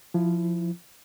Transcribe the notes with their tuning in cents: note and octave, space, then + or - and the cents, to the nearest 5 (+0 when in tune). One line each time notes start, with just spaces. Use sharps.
F3 +0 E4 +15